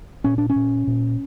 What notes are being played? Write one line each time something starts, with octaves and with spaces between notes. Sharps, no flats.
A#2 C#4
D4
C#4
A#2
A#2